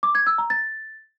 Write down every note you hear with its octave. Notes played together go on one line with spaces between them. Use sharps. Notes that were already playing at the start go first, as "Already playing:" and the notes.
D6
G#6
E6
A#5
A6